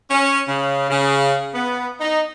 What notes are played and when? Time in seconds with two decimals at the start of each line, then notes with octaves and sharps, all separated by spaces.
0.10 C#4
0.48 C#3
0.90 C#3
1.55 B3
2.01 D#4